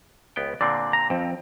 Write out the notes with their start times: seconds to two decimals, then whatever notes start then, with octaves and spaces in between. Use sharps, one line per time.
0.36 C#2 B3 G5
0.61 A#2 D3 C4 D5
0.93 A#5
1.10 F2 F3 C4